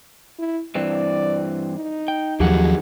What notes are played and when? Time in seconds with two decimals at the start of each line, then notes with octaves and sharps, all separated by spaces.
0.39 E4
0.75 G2 E3 C4 D5
1.75 D#4
2.08 G5
2.40 D#2 F3 F#3 G4 G#4 F#5